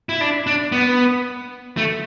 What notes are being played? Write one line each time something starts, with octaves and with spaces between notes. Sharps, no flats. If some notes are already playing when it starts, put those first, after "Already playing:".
E4
D4
D4
B3
A3